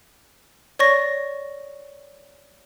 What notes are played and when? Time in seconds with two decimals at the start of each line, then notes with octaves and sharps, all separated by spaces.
0.79 C#5 D5 C#6 A#6